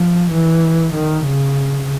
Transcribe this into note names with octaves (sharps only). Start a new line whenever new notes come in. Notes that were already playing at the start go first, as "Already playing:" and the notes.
Already playing: F3
E3
D#3
C#3